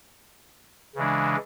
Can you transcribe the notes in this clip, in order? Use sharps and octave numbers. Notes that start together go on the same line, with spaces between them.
C#3 E3 G#3 D4